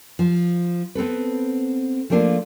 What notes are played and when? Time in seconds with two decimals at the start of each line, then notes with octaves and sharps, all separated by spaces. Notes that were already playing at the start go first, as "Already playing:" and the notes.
0.19 F3
0.95 B3 C4 A4 B4
2.10 F3 A3 A#3 D4 F4